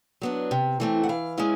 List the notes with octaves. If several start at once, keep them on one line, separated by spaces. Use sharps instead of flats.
F#3 B3 D4
C3
E3 A3 C4
F#5
E3 F5
G#3 C#4 E4